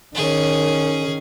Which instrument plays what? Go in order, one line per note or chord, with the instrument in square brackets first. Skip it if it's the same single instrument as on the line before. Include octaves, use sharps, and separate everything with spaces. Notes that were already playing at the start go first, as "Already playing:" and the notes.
[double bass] D#3 [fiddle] C#4 G#4